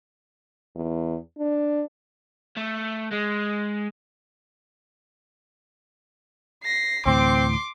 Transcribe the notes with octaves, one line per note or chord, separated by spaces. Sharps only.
E2
D4
A3
G#3
A#6 C7
D2 A2 E3 C4 C6 D6